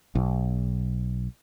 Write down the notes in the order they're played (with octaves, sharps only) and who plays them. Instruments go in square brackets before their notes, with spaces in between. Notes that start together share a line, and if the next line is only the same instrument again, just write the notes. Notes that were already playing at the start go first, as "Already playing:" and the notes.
[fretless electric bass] B1